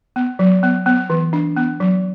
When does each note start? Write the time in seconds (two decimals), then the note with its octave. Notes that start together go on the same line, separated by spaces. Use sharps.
0.16 B3
0.39 F#3
0.63 B3
0.86 B3
1.10 E3
1.33 D4
1.56 B3
1.80 F#3